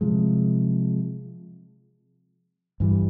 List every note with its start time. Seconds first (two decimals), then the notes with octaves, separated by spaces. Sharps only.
0.01 C3 F3 G#3
2.80 G2 E3 G3